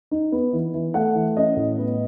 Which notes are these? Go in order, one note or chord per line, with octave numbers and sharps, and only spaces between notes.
D#4
B3
E3
E3
A3 F#5
E3
C#4 D#5
A2
B3